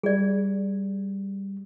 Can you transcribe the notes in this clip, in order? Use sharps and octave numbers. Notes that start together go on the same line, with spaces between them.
G3 G#4 D5